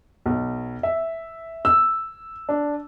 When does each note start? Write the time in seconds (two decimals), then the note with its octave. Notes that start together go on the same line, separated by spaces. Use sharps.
0.26 B1
0.83 E5
1.65 E6
2.49 D4